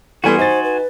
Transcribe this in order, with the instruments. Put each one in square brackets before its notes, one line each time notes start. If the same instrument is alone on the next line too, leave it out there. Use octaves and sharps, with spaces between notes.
[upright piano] E3 G3 B3 [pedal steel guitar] F#4 G#5 C6 [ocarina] A4
[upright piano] D#4 A6 [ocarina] C5
[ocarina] B4